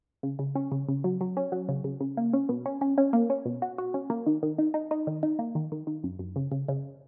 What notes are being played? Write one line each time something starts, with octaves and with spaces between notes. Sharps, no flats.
C#3
C#3
C#4
C#3
C#3
F#3
F#3
C#4
F#3
C#3
C#3
C#3
A#3
C#4
B2
C#4
C#4
C#4
A#3
C#4
B2
F#4
F#4
C#4
A#3
D#3
D#3
D#4
D#4
D#4
D#3
D#4
A#3
D#3
D#3
D#3
F#2
F#2
C#3
C#3
C#3